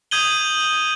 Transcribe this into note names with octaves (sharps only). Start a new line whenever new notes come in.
D#6 G6 G#6 D#7 F#7 G7